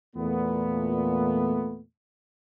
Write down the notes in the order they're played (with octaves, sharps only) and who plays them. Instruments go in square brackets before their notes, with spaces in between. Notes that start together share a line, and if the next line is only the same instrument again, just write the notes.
[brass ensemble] E2 A#2 A3 B3